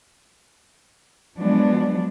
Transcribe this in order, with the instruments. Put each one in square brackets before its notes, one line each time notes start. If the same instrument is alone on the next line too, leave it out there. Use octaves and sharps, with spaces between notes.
[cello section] F3 F#3 G#3 B3 D4